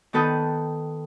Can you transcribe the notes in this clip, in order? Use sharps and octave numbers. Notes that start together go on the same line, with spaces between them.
D#3 B3 A4 B4 G5 D#6